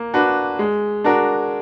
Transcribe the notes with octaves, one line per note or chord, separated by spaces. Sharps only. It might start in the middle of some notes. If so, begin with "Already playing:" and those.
Already playing: A#3
D4 F#4 B4
G#3
D4 F#4 A#4